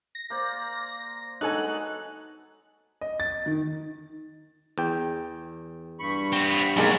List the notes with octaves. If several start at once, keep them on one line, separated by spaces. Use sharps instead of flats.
A#6
A#3 C5 D5
F#3 G#3 D#4 A4 G#5 F#6
B3
D#5
A6
D#3
E2 G5
G2 B5 C#6
B3 C4
B1 F#2 G#3 A#3